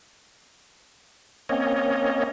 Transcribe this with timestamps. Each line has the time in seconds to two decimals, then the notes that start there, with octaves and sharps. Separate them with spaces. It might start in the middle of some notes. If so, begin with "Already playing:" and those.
1.49 A#3 C4 C#4 C#5 D#5